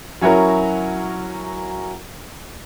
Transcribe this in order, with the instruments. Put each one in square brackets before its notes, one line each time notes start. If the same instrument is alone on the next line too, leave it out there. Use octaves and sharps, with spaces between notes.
[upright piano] F#3 C#4 E4 F#4 A#4